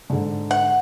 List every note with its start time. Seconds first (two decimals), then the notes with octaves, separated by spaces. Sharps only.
0.10 G#2 D3
0.51 F#5